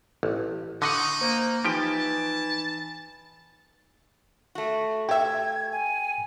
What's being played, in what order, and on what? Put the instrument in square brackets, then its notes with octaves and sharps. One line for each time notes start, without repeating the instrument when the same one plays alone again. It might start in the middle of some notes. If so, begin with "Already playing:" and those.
[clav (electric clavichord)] A1
[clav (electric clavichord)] D3 D#5 F#5 [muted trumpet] D#4 [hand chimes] C#6 D#6
[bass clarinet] A#3 [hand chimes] C5
[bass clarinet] E3 [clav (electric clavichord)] F3 G4 G5 [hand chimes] D#4 [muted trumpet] A5
[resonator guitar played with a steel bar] A3 F#4
[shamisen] G4 E5 [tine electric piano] G5 [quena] G#6
[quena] G#5